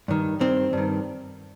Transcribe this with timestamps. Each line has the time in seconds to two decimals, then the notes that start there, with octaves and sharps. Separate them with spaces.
0.08 G2 D#3
0.40 G2 D#3 C4
0.73 G2 D#3